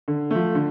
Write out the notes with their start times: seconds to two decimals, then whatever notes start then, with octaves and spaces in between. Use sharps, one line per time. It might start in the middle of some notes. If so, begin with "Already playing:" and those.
0.08 D3
0.31 F3 A3
0.55 D3